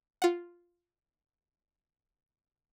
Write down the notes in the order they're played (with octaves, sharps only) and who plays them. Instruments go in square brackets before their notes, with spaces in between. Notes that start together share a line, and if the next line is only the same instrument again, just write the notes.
[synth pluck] F4 F#5